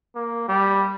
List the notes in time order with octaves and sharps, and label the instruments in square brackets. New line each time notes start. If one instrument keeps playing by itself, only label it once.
[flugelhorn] A#3
G3